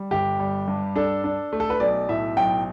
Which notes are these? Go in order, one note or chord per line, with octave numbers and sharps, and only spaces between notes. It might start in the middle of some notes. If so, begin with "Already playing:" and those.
Already playing: G3
G1 G4
G3
G2
D4 A4
D4
A3
A4
B4
B1 D5
A2 E5
B1 G5